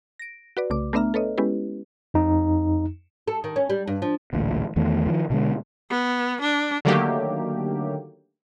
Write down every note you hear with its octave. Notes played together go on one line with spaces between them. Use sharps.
A#6 D7
F#4 B4 D5
C2 C#3 A3 D6
A3 B3 D4 E5 A#5 F6
A4 B4 C#5 D#5
G#3 B3 C#4 E4 G4 B4
F2 D#4
A4
D#3
C#4
G3
G2
F3
A1 D2 A#2
E2 D#3 A3 B3
D#3 F3
B2 D3 G#3
B3
D4
D3 D#3 F#3 A3 A#3 G4